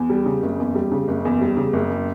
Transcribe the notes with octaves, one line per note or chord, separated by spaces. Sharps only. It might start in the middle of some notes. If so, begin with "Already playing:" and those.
Already playing: E2
G3
C#3
F#1
E2
G3
C#3
F#1
E2
G3
C#3
F#1